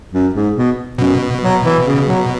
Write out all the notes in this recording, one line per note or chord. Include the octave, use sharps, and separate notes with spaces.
F#2
G#2
B2
F#2 B2
F#3
E3
C#3
F#3